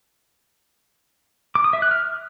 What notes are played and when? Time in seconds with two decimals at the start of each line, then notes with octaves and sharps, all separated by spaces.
1.55 D6
1.64 D#6
1.73 E5
1.82 F#6
1.91 F6